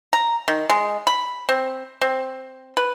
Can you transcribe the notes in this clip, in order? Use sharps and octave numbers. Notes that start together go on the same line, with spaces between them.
A#5
D#3
G#3
B5
C4
C4
B4